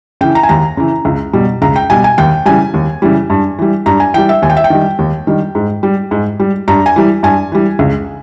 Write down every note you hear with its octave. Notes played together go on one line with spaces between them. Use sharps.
C#3 E3 G5
A#5
G#5
D#2 A#5
C#3 E3
C#2
B2 G3
C#2 A#5
G5
B2 G3 G#5
G#5
D#2 G5
C#3 E3 G3 G#5
D#2
C#3 E3 G3
G2
E3 G3
G2 A#5
G#5
E3 G3 G5
E5
D#2 G#5
G5
E5
G5
D#3 G3
D#2
D#3 G3
G#2
G3
G#2
G3
G2 A#5
G#5
E3 G3
G2 G#5
E3 G3
C#2